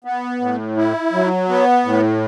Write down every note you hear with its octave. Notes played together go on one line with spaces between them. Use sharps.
B3
A2
E4
F#3
B3
A2